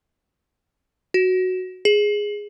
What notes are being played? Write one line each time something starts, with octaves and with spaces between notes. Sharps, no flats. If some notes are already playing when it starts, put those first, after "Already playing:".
F#4
G#4